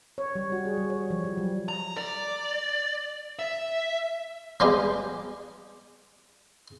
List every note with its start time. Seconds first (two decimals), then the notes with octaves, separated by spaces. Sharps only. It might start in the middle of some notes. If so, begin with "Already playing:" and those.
0.18 C#5
0.35 G3
0.52 F#4
0.65 G#4
0.77 G3
0.90 C#5
1.10 F3
1.24 G3
1.37 F#3
1.68 A#5
1.97 D5
3.39 E5
4.60 F3 G3 G#3 B3 G4